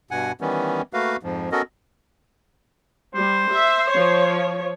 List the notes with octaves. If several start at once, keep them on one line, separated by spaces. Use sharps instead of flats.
G2 B2 F#5 G#5
D#3 E3 G3 B3 C#4
A3 A#3 F#4 B4 F5
F2 G#2 F3
B3 C#4 F#4 A4 A#4 D#5
G3 C5
E5
F3 C#5